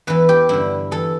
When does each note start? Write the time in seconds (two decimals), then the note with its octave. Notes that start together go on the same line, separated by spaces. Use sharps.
0.07 E2 E3 B4
0.29 G4
0.49 G2 D3 E4
0.91 E3 A4